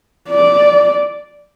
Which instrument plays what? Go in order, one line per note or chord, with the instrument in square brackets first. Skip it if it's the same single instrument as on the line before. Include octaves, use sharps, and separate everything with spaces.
[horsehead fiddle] D5